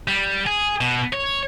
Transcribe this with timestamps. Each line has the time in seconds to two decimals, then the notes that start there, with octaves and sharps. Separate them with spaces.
0.08 G3
0.46 G#4
0.81 B2
1.13 C#5